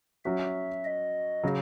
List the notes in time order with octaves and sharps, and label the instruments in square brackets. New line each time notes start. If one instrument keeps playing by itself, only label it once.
[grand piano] F#3 C#4 F#4 [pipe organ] E5
[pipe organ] D#5
[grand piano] C#3 F#3